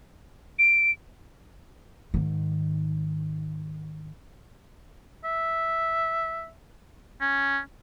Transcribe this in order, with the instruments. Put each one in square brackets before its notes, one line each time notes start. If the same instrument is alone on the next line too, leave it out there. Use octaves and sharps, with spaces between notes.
[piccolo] D7
[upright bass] G#2 D#3
[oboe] E5
C#4